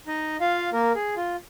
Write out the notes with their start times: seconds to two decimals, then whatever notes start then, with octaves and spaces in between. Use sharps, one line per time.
0.07 D#4 D#5
0.40 F4 F5
0.73 A#3 A#4
0.95 G#4
1.16 F4